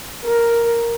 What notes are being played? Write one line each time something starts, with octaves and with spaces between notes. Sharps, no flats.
A#4